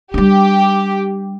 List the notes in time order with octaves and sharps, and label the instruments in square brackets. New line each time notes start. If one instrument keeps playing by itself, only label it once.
[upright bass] G3 D4 [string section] G4